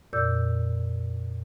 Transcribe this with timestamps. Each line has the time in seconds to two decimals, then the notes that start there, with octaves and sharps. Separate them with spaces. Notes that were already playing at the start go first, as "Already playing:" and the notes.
0.13 F2 A#2 D5 E6 G6